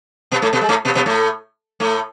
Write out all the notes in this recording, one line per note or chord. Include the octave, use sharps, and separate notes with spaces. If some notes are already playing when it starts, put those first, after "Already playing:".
B2 B3
A2 A3
B2 B3
G#3
A2 A3
B2 B3
B2 B3
A2 A3
A2 A3